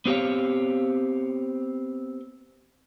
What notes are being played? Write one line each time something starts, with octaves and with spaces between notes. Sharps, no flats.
B3 C4 G4 C#5 F5